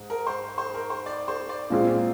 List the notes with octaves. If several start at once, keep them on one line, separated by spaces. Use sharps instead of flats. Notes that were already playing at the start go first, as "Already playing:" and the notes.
Already playing: G#2
A#4
C5
C5
A#4
C5
D5
C5
D5
A#2 G#3 C4 F4